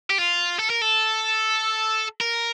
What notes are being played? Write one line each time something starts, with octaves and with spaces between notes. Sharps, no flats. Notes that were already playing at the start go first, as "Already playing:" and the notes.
G4
F4
A4
A#4
A4
A#4